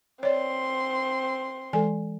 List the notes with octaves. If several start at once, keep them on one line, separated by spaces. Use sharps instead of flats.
C4 C#5 D5 C6
E3 G#3 A4 G#5